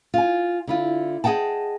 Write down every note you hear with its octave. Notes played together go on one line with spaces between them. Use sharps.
F4 G#5
D3 E4 F4
G#4 D#5 F#5 G5 A5